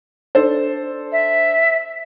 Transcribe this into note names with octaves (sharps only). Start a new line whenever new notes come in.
D4 A4 C5
E5